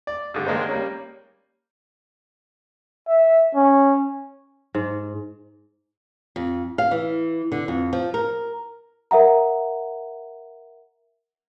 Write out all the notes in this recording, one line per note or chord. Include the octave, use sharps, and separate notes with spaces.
D5
G2 D3
D#3 G#3 A#3 D4 C5
G3 A#3 C#4
E5
C#4
G#2
F2
F5
E3
D3
F2
F3
A#4
A#4 E5 F#5 A#5